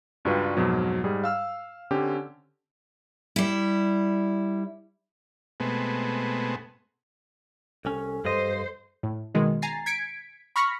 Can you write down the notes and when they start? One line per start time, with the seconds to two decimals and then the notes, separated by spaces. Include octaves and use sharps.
0.25 C#2 G2 G3 F4 F#4 B4
0.57 F2 G#2 B2 F#3
1.04 G#2 G3 G#4
1.24 F5 E6 F6
1.91 D3 C4 C#4 G4
3.36 G3 E4
5.60 B2 G#3 A3 B3 C4
7.85 C2 C#4 A4
8.25 G2 C5 D#5
9.03 A2
9.34 B2 D#3 G#3
9.62 G#5 A#5 A6 C7
9.86 G#6 B6 C#7 D7
10.56 B5 C#6 F6 A#6 B6 C#7